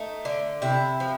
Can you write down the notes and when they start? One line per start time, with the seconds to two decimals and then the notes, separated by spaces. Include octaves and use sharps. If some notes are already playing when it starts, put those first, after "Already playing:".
Already playing: A3 D#4
0.25 D3
0.62 C3 E4
1.00 F3